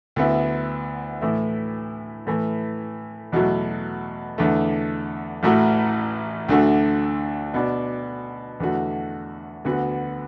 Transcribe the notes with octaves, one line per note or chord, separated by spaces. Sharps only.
D2 D3 B3 E4
A2 E3 A3 E4
A2 E3 A3
E2 B2 F#3 A3
E2 D3 A3
A1 A2 A3 F#4
D2 D3 A3 F#4
B2 B3 D4
E2 D3 A3 F#4
D2 D3 B3 F#4